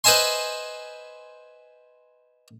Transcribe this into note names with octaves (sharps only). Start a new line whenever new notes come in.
B4 C5 D#5 E5 G#5 C6